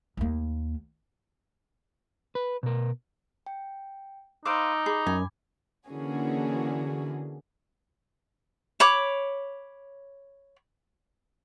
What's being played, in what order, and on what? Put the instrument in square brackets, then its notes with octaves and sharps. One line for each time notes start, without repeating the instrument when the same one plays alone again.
[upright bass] D#2 A#3
[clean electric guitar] B4
B2 A#4
[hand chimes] G5
[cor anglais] D#4 [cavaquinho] B4 C5 F5 [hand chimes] D6 E6 D7
[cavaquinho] G#4 [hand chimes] B5 D6
[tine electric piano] F#2 [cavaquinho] G#5
[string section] D3 E3 A#3 C#4 F#4 G#4
[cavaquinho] C#5 B5 D6